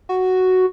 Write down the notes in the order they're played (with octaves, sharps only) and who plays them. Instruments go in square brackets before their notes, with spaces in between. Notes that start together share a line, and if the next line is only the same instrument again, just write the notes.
[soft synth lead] F#4